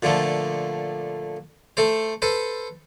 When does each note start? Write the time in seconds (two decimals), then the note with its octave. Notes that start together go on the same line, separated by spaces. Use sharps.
0.03 A#2 D3 F3 A3
1.77 A3 A4 C5
2.22 A4 B4 C5